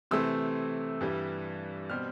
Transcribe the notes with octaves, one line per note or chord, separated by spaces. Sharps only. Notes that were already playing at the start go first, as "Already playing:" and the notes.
C3 E3 A3 C4 E6
G2 E3 G3
B2 G3 C4 F6